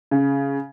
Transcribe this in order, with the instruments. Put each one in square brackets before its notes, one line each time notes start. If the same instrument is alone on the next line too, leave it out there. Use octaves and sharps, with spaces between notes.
[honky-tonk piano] C#3